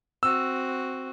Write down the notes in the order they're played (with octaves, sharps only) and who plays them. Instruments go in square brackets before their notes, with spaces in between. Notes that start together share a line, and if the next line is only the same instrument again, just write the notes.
[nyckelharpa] C4 F#4 [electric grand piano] E6